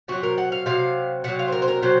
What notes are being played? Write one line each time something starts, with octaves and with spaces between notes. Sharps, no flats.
C3 F#3 F#4
A#4
F#5
F5
C3 F#3 F5
C3 F#3 F#5
F5
C5
A#4
C5
A#4
C3 F#3 C5